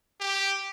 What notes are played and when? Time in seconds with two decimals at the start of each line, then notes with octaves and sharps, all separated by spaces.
0.20 G4